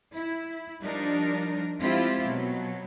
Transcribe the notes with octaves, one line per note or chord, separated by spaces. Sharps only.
E4
F3 G3 D4 D#4 A#4
F3 G#3 C4 E4 F4 G4
B2 F#3